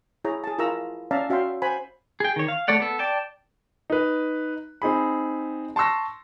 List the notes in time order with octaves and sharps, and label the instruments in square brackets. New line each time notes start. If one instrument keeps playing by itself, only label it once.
[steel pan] E4 G#4 C#5 A#5
G#4 A5
E4 F4 A#4 A#5 C#6 E6
C#4 D5 E5 F5 A5 A#5
C#4 F#4 E5 F5 G5 C6
C5 F#5 G#5 B5
[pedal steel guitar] G#4 G5
D#3 C#5
F5
A3 A4 C#5 D5 F#5
B3 A4
D5 G5 A5
[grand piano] D#4 B4
C4 D#4 G#4 B5
A5 C6 C#6 E6 A#6